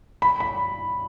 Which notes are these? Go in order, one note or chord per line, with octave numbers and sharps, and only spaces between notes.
B5
B5